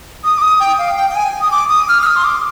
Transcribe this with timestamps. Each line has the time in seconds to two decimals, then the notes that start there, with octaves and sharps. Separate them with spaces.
0.24 D#6
0.38 D6
0.42 D#6
0.60 G5
0.78 F5
0.96 G5
1.10 G5
1.15 G#5
1.41 D#6
1.51 D6
1.69 D#6
1.89 F6
2.02 F6
2.07 D#6
2.16 C6
2.24 D6